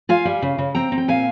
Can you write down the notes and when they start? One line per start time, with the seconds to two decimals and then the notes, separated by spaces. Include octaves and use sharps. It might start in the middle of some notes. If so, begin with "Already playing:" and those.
0.09 F4 F5 G#5
0.25 G3
0.42 C#3
0.58 C#3
0.75 C4 G5 A#5
0.92 C4
0.98 G5
1.08 A#2 F5 G#5